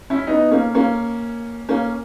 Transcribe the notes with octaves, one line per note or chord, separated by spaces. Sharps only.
C#4 E4
B3 D#4
A#3 C#4
A#3 C#4
A#3 C#4